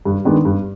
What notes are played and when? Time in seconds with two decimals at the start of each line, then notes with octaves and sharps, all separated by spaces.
0.05 G2
0.25 D#3 G#3 B3 D4
0.45 G2